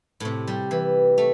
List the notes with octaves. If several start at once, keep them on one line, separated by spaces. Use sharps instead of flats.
A2 C3
G3
E3
A3